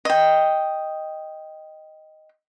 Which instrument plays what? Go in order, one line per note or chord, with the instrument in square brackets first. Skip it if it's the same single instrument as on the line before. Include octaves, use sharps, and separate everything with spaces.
[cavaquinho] D#5 G5